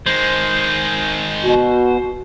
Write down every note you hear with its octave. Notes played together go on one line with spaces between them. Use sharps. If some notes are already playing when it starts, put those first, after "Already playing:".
D#3 G#3 C5
B2 F#4